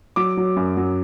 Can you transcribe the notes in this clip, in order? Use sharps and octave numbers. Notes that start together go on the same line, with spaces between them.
F#3 D6
F#3
F#2
F#3